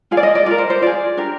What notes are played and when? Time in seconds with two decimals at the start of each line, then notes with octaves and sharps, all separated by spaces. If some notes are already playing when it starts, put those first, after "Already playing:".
0.11 F4 G#4 F5
0.17 D5
0.23 D#5
0.35 D5
0.46 F4 A#4 D5
0.58 C5
0.70 C5
0.82 F4 G#4 D5
1.17 D4 G4 A#4